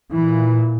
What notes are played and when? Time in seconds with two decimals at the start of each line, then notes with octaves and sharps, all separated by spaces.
0.12 A#2 E3